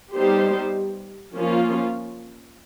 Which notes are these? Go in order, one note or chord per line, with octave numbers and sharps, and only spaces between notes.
G3 B3 D#4 G4 C5
F3 A#3 C#4 F4